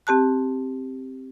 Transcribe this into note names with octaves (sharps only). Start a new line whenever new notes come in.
C4 G4 A5 F#6